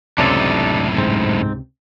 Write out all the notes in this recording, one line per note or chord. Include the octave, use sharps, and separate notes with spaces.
C#2 F#2 A2 C3 D4 D#4 A4
G#2 C4